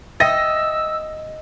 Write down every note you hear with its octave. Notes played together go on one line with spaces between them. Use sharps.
D#5 E5 G5 E6 A#6 D#7